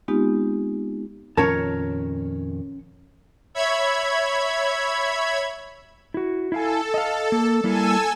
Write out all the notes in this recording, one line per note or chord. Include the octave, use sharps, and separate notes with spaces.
G#3 B3 C4 D#4 F4 G4
F2 A#2 D#3 C#4 A#4 C#5 A5
C#5 E5 B5 G#6
E4 F#4
E4 A4 F5 G#5
D#5 F5
A#3
G3 A#3 E4 A4 G#5 E6